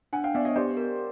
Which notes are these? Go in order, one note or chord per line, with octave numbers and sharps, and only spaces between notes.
D4 F#5 G#5
F5 G5
B3 D5 E5
C#5 D#5
G4 C5 D5
A#4